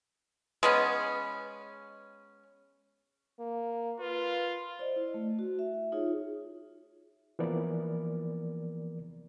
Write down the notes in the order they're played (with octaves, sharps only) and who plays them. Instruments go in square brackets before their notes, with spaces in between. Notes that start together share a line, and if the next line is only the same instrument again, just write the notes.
[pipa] G#3 B3 C#4
[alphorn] A#3
[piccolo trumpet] F4 [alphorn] B4
[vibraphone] C5 D5 D#5
E4
A3
F#4
E5
D#4 F4 G#4 C#5
[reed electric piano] E3 F3 A#3 B3 A#4 D5